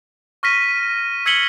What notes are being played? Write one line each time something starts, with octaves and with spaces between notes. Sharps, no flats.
C#6 F6 A#6 B6 D#7
E6 G#6 B6 C#7 F#7 G7